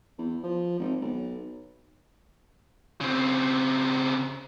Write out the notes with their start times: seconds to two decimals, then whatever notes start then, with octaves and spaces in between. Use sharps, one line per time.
0.18 E2
0.43 F3
0.79 G#1
1.02 B1
3.01 C#3 C4